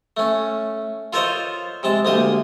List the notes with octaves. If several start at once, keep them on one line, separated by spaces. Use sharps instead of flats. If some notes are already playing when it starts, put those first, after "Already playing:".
A3 C#4
F4 A4 A#4 C5 C#5 D#5
C3 G#3 A5
D2 G#3 A#3 G4 D#6